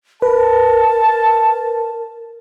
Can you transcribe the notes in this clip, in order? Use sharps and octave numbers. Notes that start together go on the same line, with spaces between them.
A#4 B4 A5